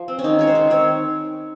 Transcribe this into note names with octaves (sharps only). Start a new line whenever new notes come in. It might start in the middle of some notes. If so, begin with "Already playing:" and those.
Already playing: F3
C4
C#4
D#3 D#4
G#3 C#5
C5
D#3
C4 C#5